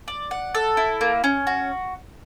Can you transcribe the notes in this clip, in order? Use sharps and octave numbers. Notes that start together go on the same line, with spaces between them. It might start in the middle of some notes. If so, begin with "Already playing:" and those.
D5
F#5
A4
E4
A#3
C#4
F#4